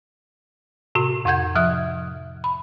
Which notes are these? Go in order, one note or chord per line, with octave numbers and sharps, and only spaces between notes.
A2 C3 F#4
F2 C3 F#5 G6 G#6
F3 E5 D#6 F#6
B5